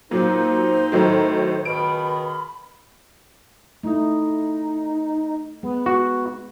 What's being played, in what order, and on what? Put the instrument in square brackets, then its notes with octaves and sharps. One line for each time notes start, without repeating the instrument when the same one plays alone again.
[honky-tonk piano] A#2 F#3 [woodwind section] A#3 C4 D#4 [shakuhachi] C5
[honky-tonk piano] A2 D#3 F#3
[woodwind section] C#2 B2 D#3 [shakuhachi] B5 [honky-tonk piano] D7
[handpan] A3 E4 [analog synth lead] D#4
[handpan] G#3 [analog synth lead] B3
[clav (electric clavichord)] F#4